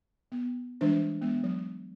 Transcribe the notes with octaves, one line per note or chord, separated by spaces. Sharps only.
B3
E3 G3 G#3 D4 C5
G#3 B3
F#3